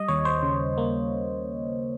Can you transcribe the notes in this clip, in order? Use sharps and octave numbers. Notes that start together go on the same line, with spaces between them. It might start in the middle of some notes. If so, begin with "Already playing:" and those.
Already playing: G3 D#5
D#2 C#5
C5
C#3
A#3